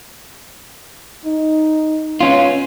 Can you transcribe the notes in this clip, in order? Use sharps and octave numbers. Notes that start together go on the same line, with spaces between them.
D#4
B3 C#4 F4